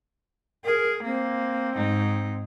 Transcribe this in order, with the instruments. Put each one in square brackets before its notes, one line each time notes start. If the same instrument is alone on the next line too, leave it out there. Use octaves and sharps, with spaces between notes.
[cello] G#4 [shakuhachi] A#4
[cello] A#3 [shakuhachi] C4
[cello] G#2 D#4